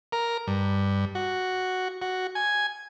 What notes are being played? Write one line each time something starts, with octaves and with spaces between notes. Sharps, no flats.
A#4
G2
F#4
F#4
G#5